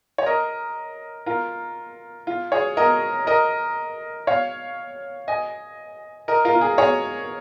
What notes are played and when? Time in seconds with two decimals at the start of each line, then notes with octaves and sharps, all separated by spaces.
0.18 C#5
0.26 A#4 D#5
1.26 F4 A#4
2.27 F4
2.52 G#4 C#5
2.77 A#4 D#5
3.27 A#4 D#5
4.27 C#5 F5
5.28 D#5 G#5
6.28 A#4 D#5
6.45 F4 A#4
6.55 F4
6.61 G#4
6.78 G#4 C#5